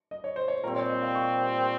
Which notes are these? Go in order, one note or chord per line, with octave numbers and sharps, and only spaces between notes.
D#5
C#5
C5
C#5
A#2 G3 C4 A#4
C#5
D#5
F5
C#6